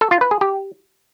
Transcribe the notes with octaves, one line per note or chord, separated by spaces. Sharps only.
A4
F4
B4
G#4
G4